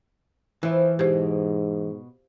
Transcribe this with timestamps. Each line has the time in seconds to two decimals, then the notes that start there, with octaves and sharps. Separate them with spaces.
0.63 E3 F3 E4
0.99 G#2 B2 G4 G#4 C5